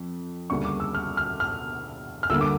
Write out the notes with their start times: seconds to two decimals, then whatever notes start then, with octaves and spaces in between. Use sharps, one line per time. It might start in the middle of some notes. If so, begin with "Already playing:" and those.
Already playing: F2
0.50 D2 C#3 G3 A#3 C#6
0.65 D6
0.80 E6
0.95 F6
1.17 F6
1.40 F6
2.23 F6
2.30 D2 D3 G3 A#3 E6
2.41 D6